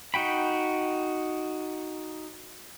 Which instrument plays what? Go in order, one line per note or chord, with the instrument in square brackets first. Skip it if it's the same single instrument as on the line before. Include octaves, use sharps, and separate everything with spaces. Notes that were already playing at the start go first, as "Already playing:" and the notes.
[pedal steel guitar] D#4 F#4 G5 B5